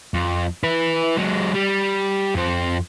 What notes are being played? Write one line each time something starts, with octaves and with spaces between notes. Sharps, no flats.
F2
E4 B4
F#3 G#3
G3
F2 C5